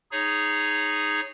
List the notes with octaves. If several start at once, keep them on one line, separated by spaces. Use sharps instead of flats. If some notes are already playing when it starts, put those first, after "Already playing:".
D#4 G#4 C#5